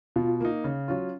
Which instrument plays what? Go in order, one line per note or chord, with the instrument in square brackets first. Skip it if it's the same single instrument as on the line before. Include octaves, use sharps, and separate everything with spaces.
[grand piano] B2 [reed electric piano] F4
[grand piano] A#3 D#4
C#3
F#3 C#4 F4